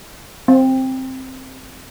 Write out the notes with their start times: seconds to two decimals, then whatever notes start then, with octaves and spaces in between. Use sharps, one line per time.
0.48 C4